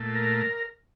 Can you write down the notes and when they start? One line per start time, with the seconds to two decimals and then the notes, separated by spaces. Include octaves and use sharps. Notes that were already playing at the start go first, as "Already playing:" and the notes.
Already playing: A#2 A3
0.15 A#4